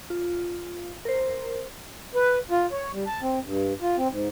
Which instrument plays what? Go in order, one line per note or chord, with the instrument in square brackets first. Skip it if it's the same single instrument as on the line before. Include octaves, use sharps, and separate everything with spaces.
[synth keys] F4
A#4 C5
[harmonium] B4
F4
C#5
G3
A5
C4
G2
F4
C4
G#2